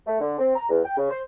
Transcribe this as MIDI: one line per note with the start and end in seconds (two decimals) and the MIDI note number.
0.07 0.17 57
0.20 0.36 50
0.38 0.55 60
0.55 0.65 82
0.69 0.80 40
0.84 0.95 79
0.97 1.09 49
1.10 1.21 72